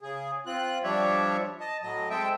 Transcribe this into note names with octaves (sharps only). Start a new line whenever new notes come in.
C#3 G#4
C4 F4 F#6
F3 G3 D4 C#5 E5
D#5 A5
A2 F#3 D#5
G#3 C4 A4 E5 G5